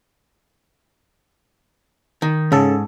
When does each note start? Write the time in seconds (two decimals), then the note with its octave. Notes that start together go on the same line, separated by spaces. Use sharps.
2.22 D#3
2.52 G#2 C#3 A4